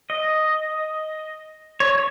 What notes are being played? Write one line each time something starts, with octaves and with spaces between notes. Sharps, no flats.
D#5
C#5